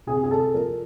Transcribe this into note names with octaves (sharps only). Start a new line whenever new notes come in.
C3 G#4
G#4
A4
F3 A#4